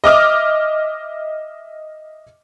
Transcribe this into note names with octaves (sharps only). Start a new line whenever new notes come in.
D#5 E5 D6 D#6 F6